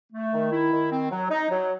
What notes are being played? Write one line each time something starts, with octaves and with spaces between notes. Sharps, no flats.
A3
D#3
E4
D#3
C4
F#3
D#4
F#3